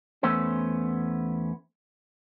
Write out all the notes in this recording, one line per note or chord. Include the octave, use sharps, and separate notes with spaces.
E2 A3 B3 C#4 C5